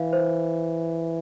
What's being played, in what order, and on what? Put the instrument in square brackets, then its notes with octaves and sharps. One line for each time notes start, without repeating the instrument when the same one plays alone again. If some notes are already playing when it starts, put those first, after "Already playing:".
Already playing: [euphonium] E3 [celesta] F5
[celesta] C5